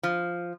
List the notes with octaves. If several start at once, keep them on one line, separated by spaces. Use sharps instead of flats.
F3